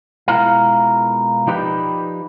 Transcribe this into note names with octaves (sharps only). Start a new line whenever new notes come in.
B2 G#3 E4 F4 A#4 F5
F3 D#4 G4 B4 D5